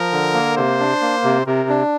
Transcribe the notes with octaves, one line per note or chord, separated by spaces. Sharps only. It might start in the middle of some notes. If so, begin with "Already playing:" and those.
Already playing: F3 A#4
D3
A#3
C3 C5
D4
A#3
C3
C3 A#4
D4